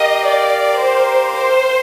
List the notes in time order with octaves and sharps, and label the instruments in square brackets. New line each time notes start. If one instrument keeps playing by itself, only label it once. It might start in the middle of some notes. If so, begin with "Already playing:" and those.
Already playing: [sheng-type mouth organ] G4 A#4 F5 [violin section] D#5
[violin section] D5
C5
C5